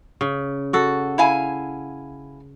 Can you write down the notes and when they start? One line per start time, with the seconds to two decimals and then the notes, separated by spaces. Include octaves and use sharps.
0.21 C#3
0.73 F#4 A4
1.18 E4 F5 G#5